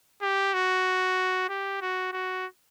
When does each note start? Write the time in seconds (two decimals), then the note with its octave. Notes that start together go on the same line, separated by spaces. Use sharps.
0.22 G4
0.54 F#4
1.49 G4
1.81 F#4
2.13 F#4